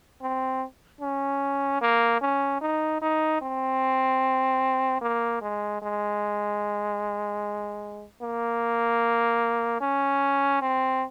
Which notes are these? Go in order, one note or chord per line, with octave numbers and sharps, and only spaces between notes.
C4
C#4
A#3
C#4
D#4
D#4
C4
A#3
G#3
G#3
A#3
C#4
C4